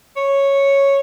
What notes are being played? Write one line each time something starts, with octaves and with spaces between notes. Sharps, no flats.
C#5